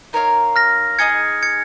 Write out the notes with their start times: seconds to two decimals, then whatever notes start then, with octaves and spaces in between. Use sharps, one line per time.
0.13 D#4 A#4 C#5 F5
0.56 F6 A#6
0.99 D#4 G#4 D#5 G#6 C#7
1.43 G#6 C#7